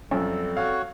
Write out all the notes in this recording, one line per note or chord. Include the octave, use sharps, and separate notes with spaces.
F#2 F3 G3 C4 C#4 A4
F#4 C#5 F5